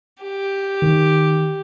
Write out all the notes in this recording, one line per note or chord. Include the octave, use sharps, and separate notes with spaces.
G4
D#3